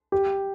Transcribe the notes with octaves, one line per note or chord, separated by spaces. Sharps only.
G4